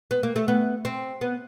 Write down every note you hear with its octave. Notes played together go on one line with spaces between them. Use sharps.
B3
A#3
A3
B3
C4
B3